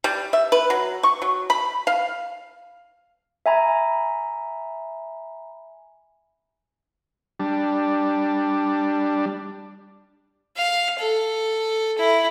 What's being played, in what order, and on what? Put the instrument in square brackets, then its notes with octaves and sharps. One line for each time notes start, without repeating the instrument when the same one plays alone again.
[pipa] G3
E5
B4
F#3
C#6
F#3
B5
F5
[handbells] E5 G#5 A#5 B5
[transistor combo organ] G3 D4
[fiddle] F5
A4
E4